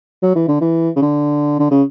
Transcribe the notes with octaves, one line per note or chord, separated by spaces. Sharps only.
F#3
E3
D3
E3
C#3
D3
D3
C#3